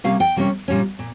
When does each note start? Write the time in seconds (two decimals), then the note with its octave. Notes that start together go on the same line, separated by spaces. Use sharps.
0.04 C3 G3 A#3 C#4 F5
0.20 G5
0.36 C3 G3 A#3 C#4
0.68 A#2 G3 C#4
0.99 A#2